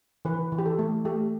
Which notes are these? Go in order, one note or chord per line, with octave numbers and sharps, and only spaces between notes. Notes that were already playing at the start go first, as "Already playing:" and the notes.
E3 B4
E3
G4
A4
A3
A3 G4